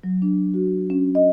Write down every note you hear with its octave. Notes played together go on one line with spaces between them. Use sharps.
F#3
D4
F#4
C#4
D#5